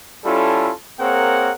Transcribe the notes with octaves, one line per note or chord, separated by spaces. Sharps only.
G3 C#4 E4 F4 A4
A#3 C4 G#4 A#4 C#5 F#5